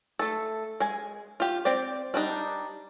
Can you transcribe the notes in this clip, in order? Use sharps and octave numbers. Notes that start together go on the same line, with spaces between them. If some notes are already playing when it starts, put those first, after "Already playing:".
A3 A4
G#3 G#5
F4 G4
C4 G4 D5
G3 D4 D#4